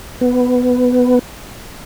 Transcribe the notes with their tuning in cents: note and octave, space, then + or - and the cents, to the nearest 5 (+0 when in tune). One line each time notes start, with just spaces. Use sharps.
B3 +10